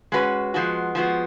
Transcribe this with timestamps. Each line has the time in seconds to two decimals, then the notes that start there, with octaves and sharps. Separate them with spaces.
0.12 G#3 C#4 F#4 B4
0.54 F3 G#3 B3 F#4
0.95 F3 G#3 B3 F#4